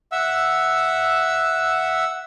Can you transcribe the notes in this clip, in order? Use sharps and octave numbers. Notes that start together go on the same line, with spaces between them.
E5 F#5 E6